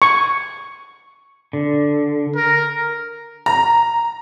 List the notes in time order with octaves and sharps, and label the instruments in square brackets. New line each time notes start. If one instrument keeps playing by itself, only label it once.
[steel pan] C#6
[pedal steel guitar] D3
[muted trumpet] A#4
[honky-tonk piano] A#5